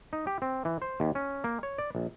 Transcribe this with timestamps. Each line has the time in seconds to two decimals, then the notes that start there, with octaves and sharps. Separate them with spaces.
0.13 D#4
0.27 G4
0.42 C4
0.65 E3
0.82 C5
1.00 D#2
1.15 C#4
1.44 A#3
1.63 C#5
1.78 D5
1.95 A#1